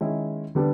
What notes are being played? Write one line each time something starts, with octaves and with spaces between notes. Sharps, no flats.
D#3 G#3 C#4 E4
D3 G3 B3 D4